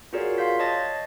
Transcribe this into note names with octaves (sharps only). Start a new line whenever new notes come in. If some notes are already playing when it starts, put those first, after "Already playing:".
F4 F#4 G#4 A#4 C#5 D5
F5 C6 G6 B6
C#5 D#5 A5 D#6 A6 A#6